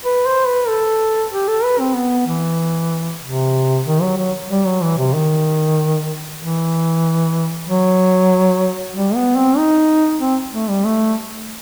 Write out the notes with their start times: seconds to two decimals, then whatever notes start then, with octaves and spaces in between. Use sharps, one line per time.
0.05 B4
0.26 C5
0.47 B4
0.68 A4
1.32 G4
1.48 A4
1.64 B4
1.80 C4
1.95 B3
2.27 E3
3.22 C3
3.86 D#3
4.01 F#3
4.18 F#3
4.50 G3
4.66 F#3
4.82 E3
4.98 C3
5.14 D#3
6.40 E3
7.67 F#3
8.94 G3
9.15 B3
9.37 C4
9.58 D#4
10.21 C4
10.53 A3
10.69 G3
10.85 A3